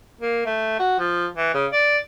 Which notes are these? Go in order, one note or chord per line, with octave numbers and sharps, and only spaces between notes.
A#3
A3
F#4
F3
E3
C#3
D5